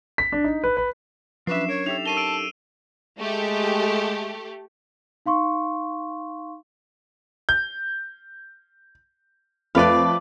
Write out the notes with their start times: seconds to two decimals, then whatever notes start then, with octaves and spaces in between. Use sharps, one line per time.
0.18 B6
0.32 D4
0.44 D#4
0.64 B4
0.77 B4
1.47 F3 F#3 C#4 D4 B4 E5 C7 E7
1.69 A#4 C#5
1.86 D#4 G4 A4 E5 G5 F7
2.06 A#4 C#5 A5 C#6 C7 D#7 G7
2.17 E6 D7
3.19 G#3 A3 G4
5.26 D#4 F5 C6 C#6
7.49 G6
9.75 F2 A3 B4 C5 D5 F5 B5 D7